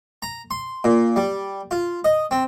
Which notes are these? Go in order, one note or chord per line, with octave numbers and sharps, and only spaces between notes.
A#5
C6
A#2
G3
F4
D#5
C4